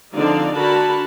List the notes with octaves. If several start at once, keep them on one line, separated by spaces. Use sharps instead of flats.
D3 F3 C4 D#4 D5 F5
D3 D4 F#4 A#4 A5 B5